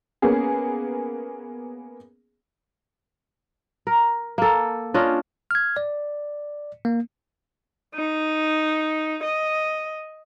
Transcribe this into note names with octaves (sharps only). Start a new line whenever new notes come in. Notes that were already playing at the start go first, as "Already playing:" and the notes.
A#3 B3 C#4 G#4
A#4
A#3 A4
C#4 D4 F4 D#5
F6 G#6
D5
A#3
D#4
D#5